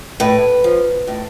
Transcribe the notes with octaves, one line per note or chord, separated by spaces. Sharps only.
A2 B4
F3
A2